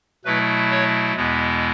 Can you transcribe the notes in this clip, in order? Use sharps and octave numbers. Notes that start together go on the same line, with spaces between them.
B2 F#3 A3 E4 B4
C#5
E2 B2 G#3 B3 E4